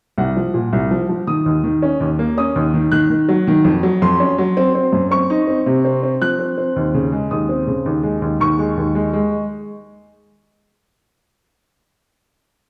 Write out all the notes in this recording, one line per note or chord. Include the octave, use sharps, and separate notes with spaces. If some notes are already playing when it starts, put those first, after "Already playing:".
C2 F#5
F3
A#2
C2
F3
F3
D#3 D#6
D#2
D#3
C#4
D#2
A#3
C#4 D#6
D#2
D#3
D#3 F#6
D#3
F#3
D#3
F2
F#3
F2 C6
C#4
F#3
C4
C4
F#2
C4 C#6
D#4
C4
C3
C4
C4
F3 F#6
C4
C4
D#2
C#3
G#3
D#2 D#6
C4
C#3
D#2
G#3
D#2
D#2 C#6
G#3
D#2
G#3
G#3